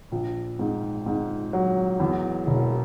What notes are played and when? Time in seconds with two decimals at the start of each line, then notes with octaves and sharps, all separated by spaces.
0.12 A#1
0.59 G#2
1.06 G#2
1.53 F#3
2.00 E2
2.47 E1